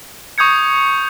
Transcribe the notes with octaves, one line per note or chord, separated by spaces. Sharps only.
C#6 D#6 G6 G#6 C#7